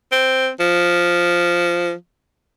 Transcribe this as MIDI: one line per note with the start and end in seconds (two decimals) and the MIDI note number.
0.12 0.49 60
0.60 1.92 53